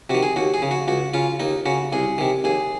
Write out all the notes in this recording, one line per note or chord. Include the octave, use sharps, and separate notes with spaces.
C3 D#3 F#4
G#4
D#2 F#4
G#4
C#3
F#4
C#2 F#4
C#3 F4
D#2 D#4
C#3 F#4
C2 G#4
C3 D#3
D#2 G#4